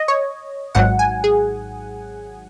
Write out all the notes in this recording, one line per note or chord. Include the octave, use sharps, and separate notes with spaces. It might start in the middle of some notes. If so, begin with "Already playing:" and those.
Already playing: D#5
C#5
G#1 G#2 F#3 F#5
G#5
G#4